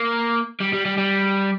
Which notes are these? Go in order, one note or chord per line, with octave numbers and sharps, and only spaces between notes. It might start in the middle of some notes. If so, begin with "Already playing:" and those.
Already playing: A#3
G3
G3
G3
G3